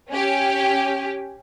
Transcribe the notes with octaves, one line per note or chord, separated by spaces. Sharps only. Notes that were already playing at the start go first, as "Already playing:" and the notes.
C#4 G4